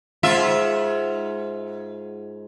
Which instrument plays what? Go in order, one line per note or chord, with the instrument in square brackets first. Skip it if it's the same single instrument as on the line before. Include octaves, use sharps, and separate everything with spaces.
[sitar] G#2 F4 E5